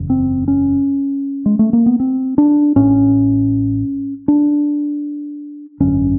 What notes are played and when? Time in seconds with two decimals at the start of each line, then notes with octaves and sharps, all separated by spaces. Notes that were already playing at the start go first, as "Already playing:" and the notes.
Already playing: F#1 E2 C#3
0.10 C4
0.48 C#4
1.46 G#3
1.59 A3
1.73 A#3
1.86 B3
2.00 C4
2.38 D4
2.76 A1 A2 C#4
4.28 D4
5.80 G#1 F#2 D3 C#4